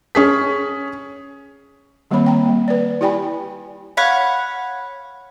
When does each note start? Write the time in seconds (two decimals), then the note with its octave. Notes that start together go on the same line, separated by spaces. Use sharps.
0.15 C#4 G#4 B6
2.11 D#3 G3 A#3 C4 C#5 B5
2.26 G5 A#5
2.45 G3 A#3
2.68 B4 D5
3.01 E4 G4 D5 G5 G#5 B5
3.97 C#5 F5 F#5 B5